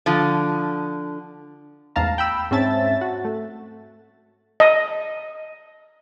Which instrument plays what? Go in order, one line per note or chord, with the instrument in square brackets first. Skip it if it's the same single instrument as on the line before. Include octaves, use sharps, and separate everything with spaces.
[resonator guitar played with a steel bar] D3 F3
[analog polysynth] A1 E2 G#2 F5 A5 A#5
G5 B5 E6
G#2 C4 C#4 E5 A5 A6
F#4
A3
[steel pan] D#5